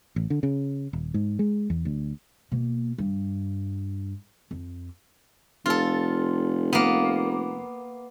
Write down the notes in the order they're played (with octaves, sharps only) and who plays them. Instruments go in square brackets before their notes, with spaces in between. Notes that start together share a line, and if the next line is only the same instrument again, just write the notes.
[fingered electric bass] A1
D3
C#3
D#1
G#2
G#3
E2
D2
[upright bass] B2 A#3
G2
F2
[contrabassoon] F1 [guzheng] F4 A4
[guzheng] A#3 B3